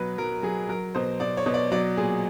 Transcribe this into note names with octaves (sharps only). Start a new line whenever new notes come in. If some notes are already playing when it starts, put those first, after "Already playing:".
Already playing: B2 F#3 B4
F#3 A#4
F#3 G#4
F#3 A#4
B2 C5
B2 D5
C#5
B2
D5
F#3 D5
A#2 G#4